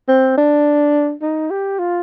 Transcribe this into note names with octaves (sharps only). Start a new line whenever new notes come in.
C4
D4
D#4
G4
F4